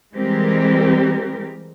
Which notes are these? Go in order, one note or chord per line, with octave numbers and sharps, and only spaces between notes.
E3 G3 G#3 C4 G4 A#4